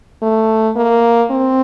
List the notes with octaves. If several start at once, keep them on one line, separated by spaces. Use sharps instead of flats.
A3
A#3
C4